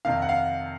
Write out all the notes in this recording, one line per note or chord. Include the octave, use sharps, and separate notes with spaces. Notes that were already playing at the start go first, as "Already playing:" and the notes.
F2 C3 D#3 F5
F#5
F5